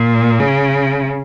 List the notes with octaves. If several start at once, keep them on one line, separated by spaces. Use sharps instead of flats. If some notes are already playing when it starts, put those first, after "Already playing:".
Already playing: A#2
C#3